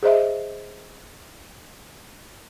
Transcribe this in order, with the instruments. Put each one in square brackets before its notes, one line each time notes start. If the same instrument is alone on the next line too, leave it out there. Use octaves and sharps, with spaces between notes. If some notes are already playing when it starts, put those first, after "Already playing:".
[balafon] G#4 C5 D#5 E5